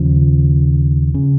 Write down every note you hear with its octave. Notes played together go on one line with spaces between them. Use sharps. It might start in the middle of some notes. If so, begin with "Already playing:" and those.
Already playing: D#2 C#3 F3
C#3